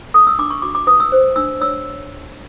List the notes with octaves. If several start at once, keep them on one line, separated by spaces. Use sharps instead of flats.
A4 D#6
E6
D4 D6
C#6
F#4 D6
D6
B4 D#6
E6
C5
D4 E6
C#5 E6